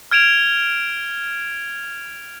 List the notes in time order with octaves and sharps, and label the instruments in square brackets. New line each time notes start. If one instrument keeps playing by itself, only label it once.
[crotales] F6 G#6 D7 E7 F7